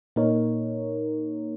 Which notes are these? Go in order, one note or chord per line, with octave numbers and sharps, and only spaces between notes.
A#2 A#3 D#4 A#4 C#5